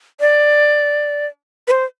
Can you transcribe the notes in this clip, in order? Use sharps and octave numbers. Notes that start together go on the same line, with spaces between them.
D5
B4
C5